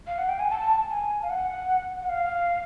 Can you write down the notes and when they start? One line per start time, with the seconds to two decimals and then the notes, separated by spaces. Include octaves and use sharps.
0.07 F5
0.18 F#5
0.29 G5
0.39 G#5
0.50 A5
0.90 G#5
1.23 F5
1.30 F#5
2.02 F#5
2.09 F5